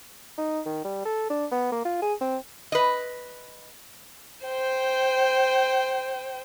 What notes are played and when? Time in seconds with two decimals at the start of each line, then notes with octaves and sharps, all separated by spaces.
0.38 D#4
0.66 D#3
0.84 G3
1.05 A4
1.30 D4
1.51 B3
1.72 A#3
1.85 F4
2.02 G#4
2.21 C4
2.72 B4 D#5
4.45 C5 G5